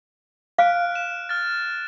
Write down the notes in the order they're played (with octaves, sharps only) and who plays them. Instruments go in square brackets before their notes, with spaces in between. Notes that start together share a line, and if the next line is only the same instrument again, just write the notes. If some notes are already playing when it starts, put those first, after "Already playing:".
[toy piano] F5 [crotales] F6 F#6 D7
[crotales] E7
F6 A6